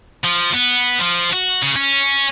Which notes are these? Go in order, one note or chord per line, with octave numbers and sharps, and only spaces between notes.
F3
B3
F3
F#4
C#3
C#4